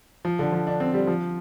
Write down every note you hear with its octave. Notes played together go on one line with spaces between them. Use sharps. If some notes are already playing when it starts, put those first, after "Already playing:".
F3
D3
F3
D4
C4
G3
F3